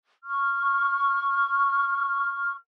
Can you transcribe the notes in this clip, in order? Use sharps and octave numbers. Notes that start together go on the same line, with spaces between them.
C#6 F6